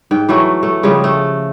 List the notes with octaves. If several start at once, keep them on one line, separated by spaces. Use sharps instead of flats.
G#2 G5
E3 F#3 A3
A3
C#3 F3 G3 G#3
A3